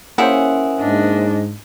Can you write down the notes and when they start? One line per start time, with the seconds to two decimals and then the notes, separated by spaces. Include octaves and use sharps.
0.18 A#3 C#4 E4 G#4 C5 F#5
0.80 G#2 D4 D#5